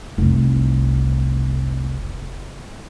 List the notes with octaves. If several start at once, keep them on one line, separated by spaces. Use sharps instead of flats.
F1 C2